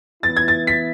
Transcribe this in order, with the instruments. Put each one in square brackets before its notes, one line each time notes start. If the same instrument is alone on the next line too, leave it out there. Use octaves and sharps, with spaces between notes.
[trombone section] E3 B3 E4 [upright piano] A6
[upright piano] G#6
A6
B6